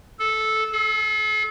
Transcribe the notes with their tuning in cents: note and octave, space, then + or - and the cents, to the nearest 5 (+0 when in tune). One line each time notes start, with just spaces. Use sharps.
A4 -10
A4 -40